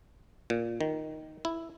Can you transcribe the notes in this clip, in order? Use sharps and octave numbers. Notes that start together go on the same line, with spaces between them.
A#2
D#3
E4